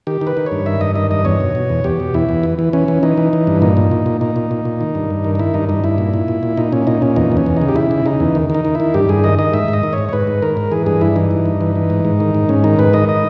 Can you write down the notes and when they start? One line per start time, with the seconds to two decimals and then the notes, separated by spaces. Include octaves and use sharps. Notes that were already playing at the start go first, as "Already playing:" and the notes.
0.07 D#3 G4
0.21 D#3
0.27 B4
0.37 D#3
0.46 C#5
0.52 G2
0.66 D#3 E5
0.81 G2 D#5
0.95 D#3 D#5
1.11 G2 D#5
1.25 E2 C#5
1.40 B2
1.55 B2
1.70 E2
1.84 E2 G4
2.00 B2
2.14 E2 E4
2.29 E2
2.43 E3
2.59 E3
2.73 E3 C#4
2.88 E3
3.03 E3 D#4
3.17 E3
3.33 E3
3.47 G2
3.62 A#2 D#4
3.77 A#2
3.91 A#2
4.06 A#2
4.21 A#2 D#4
4.36 A#2
4.51 A#2
4.65 A#2
4.81 D#3
4.95 G2
5.10 G2
5.24 D#3
5.35 D#4
5.39 D#3 E4
5.54 G2 D#4
5.69 G2 D#4
5.84 G2 E4
5.98 A#2
6.13 A#2
6.28 A#2
6.43 A#2
6.57 A#2 D#4
6.72 A#2 C#4
6.87 A#2 D#4
7.02 A#2 C#4
7.16 E2 D#4
7.32 E2
7.37 C#4
7.46 E2
7.57 C#3 D#4
7.68 G4
7.76 C#3 E4
7.91 C#3
8.06 C#3 D#4
8.20 E2
8.35 D#3
8.50 D#3 D#4
8.65 D#3
8.75 D#3 E4
8.94 G2 G4
9.09 G2 G#4
9.24 D#3 D#5
9.39 D#3 D#5
9.53 G#2 E5
9.68 G#2
9.73 D#5
9.83 D#3
9.93 C#5
9.98 G#2
10.09 C#5
10.13 G#2 B4
10.27 G#2
10.42 D#3 A#4
10.57 G#2
10.71 E3 G#4
10.86 G2 G#4
11.01 G2 E4
11.16 E3 D#4
11.31 G2
11.46 G2
11.61 E3
11.75 E3
11.90 G#2
12.05 G#2
12.20 D#3
12.34 G#2
12.49 G#2 C#4
12.64 D#3 D#4
12.79 G#2 B4
12.93 D#3 D#5
13.09 D#5